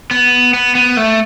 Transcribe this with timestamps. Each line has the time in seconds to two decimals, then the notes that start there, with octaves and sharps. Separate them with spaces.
0.11 B3
0.54 B3
0.75 B3
0.97 A3